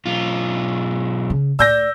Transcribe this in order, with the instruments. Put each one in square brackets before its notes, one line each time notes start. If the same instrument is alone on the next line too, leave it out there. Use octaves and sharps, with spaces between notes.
[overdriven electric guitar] B1 F4
[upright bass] C#3
[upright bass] A2 [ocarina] D5 [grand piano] E6 G6 A#6